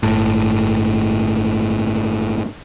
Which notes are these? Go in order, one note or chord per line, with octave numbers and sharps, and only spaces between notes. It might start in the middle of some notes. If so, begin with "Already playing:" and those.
G1 A2